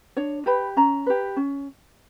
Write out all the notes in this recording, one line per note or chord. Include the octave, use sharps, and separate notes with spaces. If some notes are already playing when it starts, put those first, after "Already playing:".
D4 C#5
G4 B4 B5
C#4 A#5
G4 B4
C#4